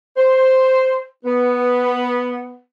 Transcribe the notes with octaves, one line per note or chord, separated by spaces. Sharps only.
C5
B3